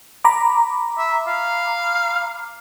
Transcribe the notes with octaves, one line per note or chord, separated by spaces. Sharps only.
A#5 B5 D6
E5
F5